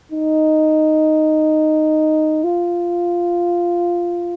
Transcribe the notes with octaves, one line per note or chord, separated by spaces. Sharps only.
D#4
F4